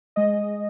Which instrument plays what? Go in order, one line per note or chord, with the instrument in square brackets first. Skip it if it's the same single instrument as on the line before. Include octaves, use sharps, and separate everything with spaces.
[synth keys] G#3 D#5